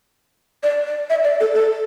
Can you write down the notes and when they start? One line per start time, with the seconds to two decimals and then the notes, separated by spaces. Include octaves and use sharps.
0.63 D5
0.87 D5
1.10 E5
1.24 D5
1.40 A4
1.54 A4